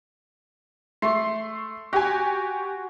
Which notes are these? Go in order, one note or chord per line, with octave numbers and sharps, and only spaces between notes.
A3 C6 C#6
F#4 G4 G#5